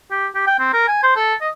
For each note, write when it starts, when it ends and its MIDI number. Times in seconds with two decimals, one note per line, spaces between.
0.11 0.27 67
0.35 0.43 67
0.47 0.57 79
0.59 0.69 60
0.73 0.88 70
0.88 1.01 80
1.03 1.15 72
1.17 1.34 69
1.41 1.49 75